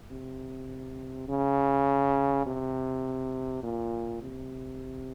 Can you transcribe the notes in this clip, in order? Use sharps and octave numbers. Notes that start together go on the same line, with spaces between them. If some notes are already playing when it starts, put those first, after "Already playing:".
C3
C#3
C3
A#2
C3